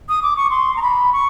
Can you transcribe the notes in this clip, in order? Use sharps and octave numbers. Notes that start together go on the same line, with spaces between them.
D#6
D6
C#6
C6
A#5
B5
C#6